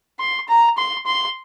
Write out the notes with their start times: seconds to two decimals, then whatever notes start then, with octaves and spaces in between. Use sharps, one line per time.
0.19 C6
0.48 A#5
0.78 C6
1.06 C6